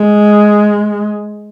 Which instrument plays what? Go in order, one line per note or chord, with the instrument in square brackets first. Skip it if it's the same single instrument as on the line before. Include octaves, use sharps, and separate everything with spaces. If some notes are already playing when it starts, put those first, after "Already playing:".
Already playing: [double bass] G#3